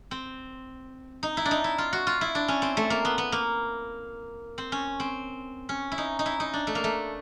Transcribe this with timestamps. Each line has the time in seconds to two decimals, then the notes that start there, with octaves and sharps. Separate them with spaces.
0.11 C4
1.23 D#4
1.37 E4
1.45 D4
1.51 D#4
1.64 E4
1.78 F4
1.93 F#4
2.07 F4
2.21 E4
2.35 D4
2.48 C#4
2.62 C4
2.77 A3
2.90 A#3
3.05 B3
3.18 B3
3.32 A#3
4.58 C4
4.72 C#4
5.00 C4
5.69 C#4
5.92 E4
5.98 D#4
6.19 D#4
6.26 E4
6.40 D#4
6.53 D4
6.67 A3
6.75 A#3
6.84 A3